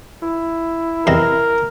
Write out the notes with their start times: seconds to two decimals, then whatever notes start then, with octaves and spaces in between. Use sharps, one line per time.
0.22 E4
1.07 E2 C3 A#4 D#5